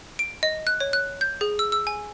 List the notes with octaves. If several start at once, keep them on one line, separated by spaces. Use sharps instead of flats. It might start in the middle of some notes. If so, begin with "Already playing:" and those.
D7
D#5
F#6
C#5
F#6
G6
G#4
E6
E6
G#5